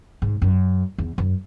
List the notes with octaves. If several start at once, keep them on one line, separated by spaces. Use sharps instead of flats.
G#2
F#2
E2
F#2